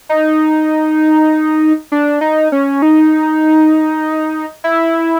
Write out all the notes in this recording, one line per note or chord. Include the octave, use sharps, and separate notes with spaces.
D#4
D4
D#4
C#4
D#4
E4